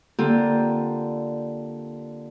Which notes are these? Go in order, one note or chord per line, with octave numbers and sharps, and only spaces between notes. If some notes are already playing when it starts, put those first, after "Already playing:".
D3 A#3 C4 F4 G4 A4